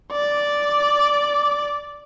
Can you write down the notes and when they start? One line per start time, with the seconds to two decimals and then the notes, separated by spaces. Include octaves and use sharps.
0.13 D5 D6